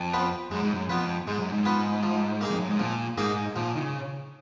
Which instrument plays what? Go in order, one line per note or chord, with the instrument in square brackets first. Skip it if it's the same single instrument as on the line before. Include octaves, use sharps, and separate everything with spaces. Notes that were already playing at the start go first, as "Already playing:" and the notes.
Already playing: [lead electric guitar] F2
[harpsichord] B3 F4 B4
[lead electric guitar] F#2 [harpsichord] G#3
[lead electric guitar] G#2
F#2
[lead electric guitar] F2 [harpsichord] B3 F4 B4
[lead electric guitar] G#2 [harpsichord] G#3
[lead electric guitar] F#2
G#2
[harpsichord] B3 F4 B4
F3
A#3 D#4 G#4
[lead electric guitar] F2
F#2
G#2
[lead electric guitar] A#2 [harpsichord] F3
[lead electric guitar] G#2 [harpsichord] A#3 D#4 G#4
[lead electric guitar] A#2 [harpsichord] F3
[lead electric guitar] D#3
C#3